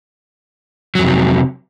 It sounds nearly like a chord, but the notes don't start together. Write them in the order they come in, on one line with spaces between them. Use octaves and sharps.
F#3 F2 C3